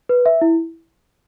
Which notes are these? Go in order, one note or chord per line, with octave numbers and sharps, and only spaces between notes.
B4
E5
E4